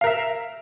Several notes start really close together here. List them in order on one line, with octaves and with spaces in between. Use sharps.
F5 A#4 E5